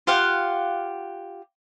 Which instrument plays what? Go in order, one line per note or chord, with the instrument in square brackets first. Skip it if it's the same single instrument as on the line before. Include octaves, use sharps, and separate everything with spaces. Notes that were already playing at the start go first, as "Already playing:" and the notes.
[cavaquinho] F4 G4 F5 F#5